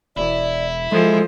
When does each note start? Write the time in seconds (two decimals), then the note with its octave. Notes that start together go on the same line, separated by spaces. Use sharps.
0.17 E1 E4 D5
0.92 F3 G#3 A4